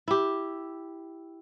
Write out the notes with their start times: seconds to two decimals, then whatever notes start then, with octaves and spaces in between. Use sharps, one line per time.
0.08 E4 G4